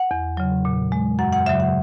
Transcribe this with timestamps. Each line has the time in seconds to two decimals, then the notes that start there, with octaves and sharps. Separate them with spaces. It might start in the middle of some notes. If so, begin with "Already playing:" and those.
Already playing: F#5
0.11 E2
0.37 C#3 F#3
0.65 A#2
0.92 G#3
1.19 F#2 F#5
1.32 F#5
1.46 C#3 F#3 E5
1.60 F#5